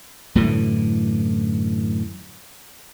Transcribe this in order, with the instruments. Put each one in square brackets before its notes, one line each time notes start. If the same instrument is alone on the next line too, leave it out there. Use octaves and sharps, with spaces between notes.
[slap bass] F#2 A2 D3 E3